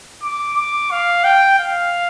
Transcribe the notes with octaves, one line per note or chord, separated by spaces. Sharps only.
D6
D6
F5
G5
F5